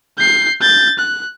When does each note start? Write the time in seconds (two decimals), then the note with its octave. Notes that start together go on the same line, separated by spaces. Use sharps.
0.18 G6 C7
0.61 G6 A6
0.99 F#6